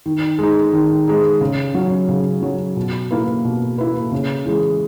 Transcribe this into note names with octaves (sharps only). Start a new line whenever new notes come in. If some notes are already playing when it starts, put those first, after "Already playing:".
D#3
G#3 D#4
D#3
G#3 D#4
C#3
F#3 C#4
C#3
F#3 C#4
B2
A#3 E4 B4
B2
A#3 E4 B4
C#3
E3 G#3